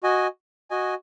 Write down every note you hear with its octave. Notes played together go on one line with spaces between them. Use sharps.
F#4 D#5 G#5
F#4 D#5 G#5